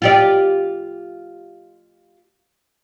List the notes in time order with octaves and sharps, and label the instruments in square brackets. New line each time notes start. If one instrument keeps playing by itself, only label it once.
[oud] F4 G4 D5